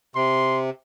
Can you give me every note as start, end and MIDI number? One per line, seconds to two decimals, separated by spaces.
0.15 0.70 48
0.15 0.60 84